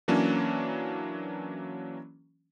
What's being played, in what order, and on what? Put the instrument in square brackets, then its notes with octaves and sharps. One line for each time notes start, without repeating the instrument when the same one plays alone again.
[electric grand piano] E3 F#3 A#3 C#4 D4